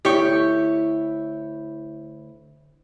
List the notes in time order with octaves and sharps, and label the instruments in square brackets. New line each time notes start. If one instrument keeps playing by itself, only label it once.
[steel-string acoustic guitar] D2 E4 C#5 [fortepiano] G4 C#6